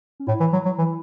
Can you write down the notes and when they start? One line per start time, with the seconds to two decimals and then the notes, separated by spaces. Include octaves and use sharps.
0.20 C#4
0.27 A2 E4
0.40 E3
0.53 F#3
0.65 F#3
0.78 E3